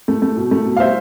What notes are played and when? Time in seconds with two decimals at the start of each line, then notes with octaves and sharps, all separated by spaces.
0.08 A3
0.22 A3
0.37 B2
0.51 A3
0.66 B2
0.76 F5
0.80 G3 C5 E5